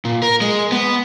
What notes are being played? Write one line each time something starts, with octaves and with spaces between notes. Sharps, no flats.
A#2
A#4
G#3
B3